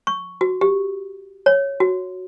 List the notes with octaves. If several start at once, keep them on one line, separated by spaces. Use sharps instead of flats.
C#6
F#4
G4
C#5
F#4